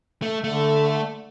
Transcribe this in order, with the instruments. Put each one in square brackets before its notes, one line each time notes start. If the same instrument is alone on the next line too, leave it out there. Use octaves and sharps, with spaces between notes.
[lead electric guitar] A3
[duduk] D3 [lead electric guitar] A3